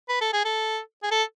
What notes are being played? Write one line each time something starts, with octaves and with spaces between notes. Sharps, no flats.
B4
A4
G#4
A4
G#4
A4